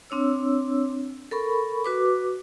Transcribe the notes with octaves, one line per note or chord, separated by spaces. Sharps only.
C4 D4 C#5 E6
A4 A#4 B5 C#6
F#4 B4 D6